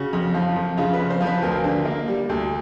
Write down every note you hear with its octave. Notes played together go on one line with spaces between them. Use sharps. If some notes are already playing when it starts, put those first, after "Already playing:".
Already playing: C#3 F#4
F2
F3
F2
C#3 F4
B4
F2
C5
F3
B4
D2 A#4
D3
A#3
G3
D2